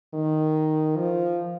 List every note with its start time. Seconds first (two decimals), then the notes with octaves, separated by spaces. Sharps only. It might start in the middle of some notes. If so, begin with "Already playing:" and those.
0.14 D#3
0.96 F3